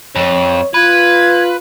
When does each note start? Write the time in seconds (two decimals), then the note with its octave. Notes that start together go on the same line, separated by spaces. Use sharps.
0.16 F2 C#5
0.74 F4 B4 G#6